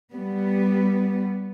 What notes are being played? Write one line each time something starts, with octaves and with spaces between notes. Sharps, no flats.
G3 B3